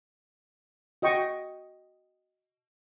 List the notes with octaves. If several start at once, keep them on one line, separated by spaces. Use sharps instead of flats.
F#4 D#5 G5 C#6